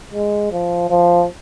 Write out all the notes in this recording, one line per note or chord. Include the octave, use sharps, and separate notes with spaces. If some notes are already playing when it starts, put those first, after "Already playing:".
G#3
F3
F3